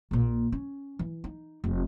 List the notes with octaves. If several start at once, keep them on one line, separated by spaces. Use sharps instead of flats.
A#1 A#2
C#4
E3
D#4
F1